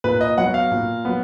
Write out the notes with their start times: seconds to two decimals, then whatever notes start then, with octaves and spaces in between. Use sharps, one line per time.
0.04 A#2 B4
0.21 D#5
0.38 F#3 B3 F#5
0.54 F5
0.71 A#2
1.05 F#3 B3